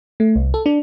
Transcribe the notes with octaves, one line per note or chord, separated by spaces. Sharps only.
A3
C2
A4
D4